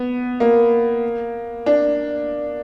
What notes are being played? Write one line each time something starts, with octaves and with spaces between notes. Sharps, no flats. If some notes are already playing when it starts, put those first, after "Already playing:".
Already playing: B3
A#3
D4